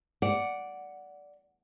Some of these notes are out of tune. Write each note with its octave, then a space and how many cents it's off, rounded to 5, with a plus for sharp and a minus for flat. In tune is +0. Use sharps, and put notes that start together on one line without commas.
D5 -10 F#5 +0